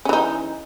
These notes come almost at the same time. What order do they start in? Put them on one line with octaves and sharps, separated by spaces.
C#4 E3 D#4